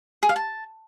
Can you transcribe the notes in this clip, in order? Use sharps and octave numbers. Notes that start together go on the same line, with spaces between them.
G#4
F5
A5